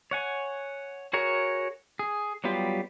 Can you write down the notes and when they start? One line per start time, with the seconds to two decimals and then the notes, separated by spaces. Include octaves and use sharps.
0.11 C#5 F#5 G#5
1.13 F#4 G#4 A#4 C#5
1.99 G#4
2.44 F#3 G3 B3 F4 G4